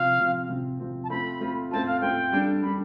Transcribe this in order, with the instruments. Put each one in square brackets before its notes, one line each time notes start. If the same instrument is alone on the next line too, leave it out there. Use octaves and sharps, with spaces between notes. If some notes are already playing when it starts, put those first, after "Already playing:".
Already playing: [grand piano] C3 F3 C4 [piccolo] F5
[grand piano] C3 F3 C4
C3 F3 C4
C3 F3 C4
[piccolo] A5
[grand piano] A3 C4 F4 [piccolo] B5
[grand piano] A3 C4 F4
[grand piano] A3 C4 F4 [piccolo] A5
[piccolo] F5
[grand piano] A3 C4 F4 [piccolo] G5
[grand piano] G3 D4 A4
[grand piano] G3 D4 A4 [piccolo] B5